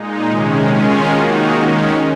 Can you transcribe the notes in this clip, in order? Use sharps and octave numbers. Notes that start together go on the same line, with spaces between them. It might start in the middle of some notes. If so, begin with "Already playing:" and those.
Already playing: A#2 G#3 D#4
C3 D#3 G#3 C#4
D#3 G#3 C#4 F4 G#4
D#3 A#3 D#4 F#4
D#3 G#3 C#4